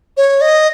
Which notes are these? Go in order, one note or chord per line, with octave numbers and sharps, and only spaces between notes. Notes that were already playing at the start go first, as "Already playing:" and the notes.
C#5
D#5